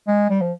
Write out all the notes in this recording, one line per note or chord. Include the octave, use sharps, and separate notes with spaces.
G#3
G3
F3